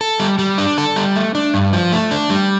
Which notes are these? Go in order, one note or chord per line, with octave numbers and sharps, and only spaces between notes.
A4
G3
G3
D4
A4
G3
A3
D4
G2
F3
A3
D4
G3